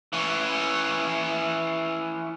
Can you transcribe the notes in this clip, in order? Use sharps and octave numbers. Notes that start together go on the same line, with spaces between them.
E3 C#4